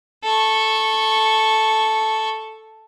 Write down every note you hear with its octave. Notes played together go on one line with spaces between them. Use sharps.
A4 C#6